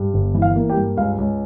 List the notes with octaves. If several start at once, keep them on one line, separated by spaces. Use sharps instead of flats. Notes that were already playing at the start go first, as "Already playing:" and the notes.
Already playing: G2
G1
E3
F5
A#3
G4 G5
G2
C#2 F5
C#2